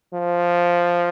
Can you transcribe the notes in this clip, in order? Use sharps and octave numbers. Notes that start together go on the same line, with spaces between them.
F3